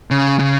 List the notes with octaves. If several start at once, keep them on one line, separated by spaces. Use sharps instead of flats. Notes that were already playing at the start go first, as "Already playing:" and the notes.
C#3
C#3